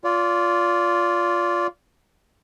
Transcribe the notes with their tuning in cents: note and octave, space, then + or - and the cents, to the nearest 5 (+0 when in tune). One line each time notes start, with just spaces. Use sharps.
F4 +0 D5 -30